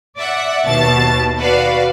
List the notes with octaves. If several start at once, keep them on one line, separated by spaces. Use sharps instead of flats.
D5 E5 F#5
D#2 B2 A5 A6
F#4 B4 D5 F5